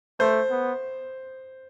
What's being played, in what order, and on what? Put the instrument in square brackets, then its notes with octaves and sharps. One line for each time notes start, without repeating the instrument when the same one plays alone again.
[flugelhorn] A3 [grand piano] C5
[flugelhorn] B3